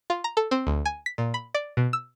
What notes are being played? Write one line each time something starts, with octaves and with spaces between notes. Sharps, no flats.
F4
A#5
A4
C4
D2
G#5
B6
A#2
B5
D5
B2
E6